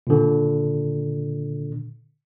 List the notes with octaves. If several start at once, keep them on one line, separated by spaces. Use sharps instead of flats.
A#2 D3